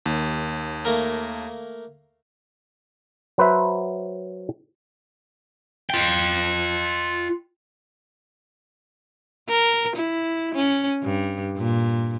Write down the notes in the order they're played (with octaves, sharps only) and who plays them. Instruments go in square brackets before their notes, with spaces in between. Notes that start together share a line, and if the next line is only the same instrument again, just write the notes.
[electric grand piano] D#2
[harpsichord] A3 A#3 A#4
[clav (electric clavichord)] F#3 B4 C5 E5
[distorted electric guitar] F4 G5
[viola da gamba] A#4
E4
C#4
G2
A#2